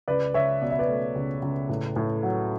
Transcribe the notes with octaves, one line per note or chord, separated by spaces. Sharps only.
C#2 B4 D5
C#2 C#5 E5
B2 D5
E5
B4 D5
A3
C#2
C#2
A2
A2
F#3